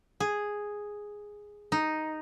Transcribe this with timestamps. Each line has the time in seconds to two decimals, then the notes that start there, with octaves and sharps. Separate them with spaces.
0.20 G#4
1.72 D#4